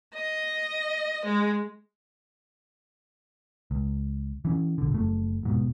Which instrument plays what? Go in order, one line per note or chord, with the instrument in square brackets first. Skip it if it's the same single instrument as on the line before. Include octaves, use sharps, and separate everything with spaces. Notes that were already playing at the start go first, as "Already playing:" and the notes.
[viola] D#5
G#3
[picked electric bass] C#2
E3 C#4
A#1 D3
F#1 A3
D#1 G#2 B2